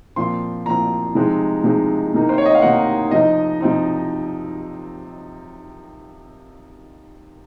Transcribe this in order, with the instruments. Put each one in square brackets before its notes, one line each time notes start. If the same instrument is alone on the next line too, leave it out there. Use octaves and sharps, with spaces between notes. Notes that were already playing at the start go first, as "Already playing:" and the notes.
[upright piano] A#2 F3 C4 C6
A#2 F3 C4 A#5
C3 F3 G#3 C4 D#4
C3 F3 G#3 C4 D#4
C3 D#3 A#3 D#4
C5
C#5
D#5
F5
C3 D#3 A#3 D#4 F#5
C3 F3 C4 D#4 D#5
C3 F3 C4 D#4